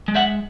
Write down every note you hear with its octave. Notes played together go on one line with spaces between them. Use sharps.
G#3
E5 F#5